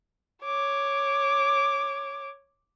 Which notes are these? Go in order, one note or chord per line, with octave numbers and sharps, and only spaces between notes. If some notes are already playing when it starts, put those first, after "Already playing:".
C#5 D6